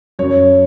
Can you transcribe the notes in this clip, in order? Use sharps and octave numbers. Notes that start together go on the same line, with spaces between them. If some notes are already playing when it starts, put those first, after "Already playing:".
F#2 F#3 C#5